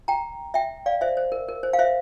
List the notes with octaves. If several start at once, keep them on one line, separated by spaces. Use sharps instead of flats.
G5 A#5
E5 G5
D5 F5
C5 E5
C5
A#4
A#4
C5
F5
C5 E5